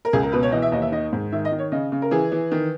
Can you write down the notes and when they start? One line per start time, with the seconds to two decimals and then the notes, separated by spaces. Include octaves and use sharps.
0.05 A#4
0.13 C#2 G#4
0.23 A#4
0.32 B2 B4
0.43 C#5
0.52 E3 D#5
0.62 E5
0.72 D#2 D#5
0.82 E5
0.92 D#3 D#5
1.13 G#2
1.32 D#3 E5
1.45 D#5
1.52 D#3
1.59 C#5
1.72 C#3 D#5
1.92 C#3
2.02 A#4
2.11 E3 G#4
2.32 E3
2.51 D#3